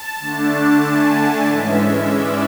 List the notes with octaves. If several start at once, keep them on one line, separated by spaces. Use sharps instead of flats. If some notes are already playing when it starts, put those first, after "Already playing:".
Already playing: A5
D3 A3 D4
G#5
G#2 E3 G#3 C#4 E5
D5